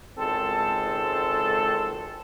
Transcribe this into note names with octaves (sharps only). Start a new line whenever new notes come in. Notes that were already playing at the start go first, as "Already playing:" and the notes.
G#1 C#2 G#3 C4 A4